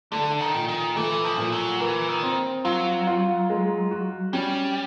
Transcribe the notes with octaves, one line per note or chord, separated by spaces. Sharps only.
D3 A3
D#3
A#2
D#3
E3 A3
F3
A#2
F#3
E3 A#4
D#3
C4
F#3 F4
F4
G#3
F#4
G3 C#4